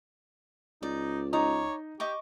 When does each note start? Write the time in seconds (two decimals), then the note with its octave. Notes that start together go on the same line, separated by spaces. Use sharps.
0.83 C#2 D#4 D5
1.33 D#4 C#5 D5 A#5 D#6
2.00 G4 D#5 C#6 D6